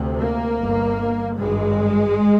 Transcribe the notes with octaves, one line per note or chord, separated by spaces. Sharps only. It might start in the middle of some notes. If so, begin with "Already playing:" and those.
Already playing: D2 C3
A#3
G1 G2
G#1 G2 G#3